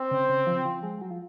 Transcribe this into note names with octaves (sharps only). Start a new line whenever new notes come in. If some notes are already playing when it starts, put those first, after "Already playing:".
Already playing: C4
C#3
C#3
F3
F3
G#3
F#3
F3